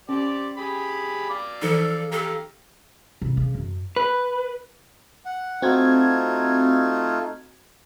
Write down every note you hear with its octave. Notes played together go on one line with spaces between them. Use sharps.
C#4 G4 C5 D5
G4 G#4 B5
D5 F5 D6
E3 F3 D#4 A4
G4 A4 F5 A#5
C2
C#3
F#2
B4
F#5
A3 C4 D#4 F4 F#4 G#6